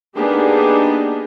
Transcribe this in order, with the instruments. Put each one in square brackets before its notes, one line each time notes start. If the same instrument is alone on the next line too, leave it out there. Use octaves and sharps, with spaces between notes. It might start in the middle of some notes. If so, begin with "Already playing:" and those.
[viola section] A#3 B3 D4 D#4 G4 G#4